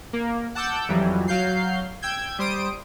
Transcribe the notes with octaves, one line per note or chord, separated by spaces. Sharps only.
A#3
F#5 A5 D6 E6 G6
F2 E3 F#3 G3
F#3 F5 G6 C7
G5 E6 G6 G#6
G3 C5 D#6 D7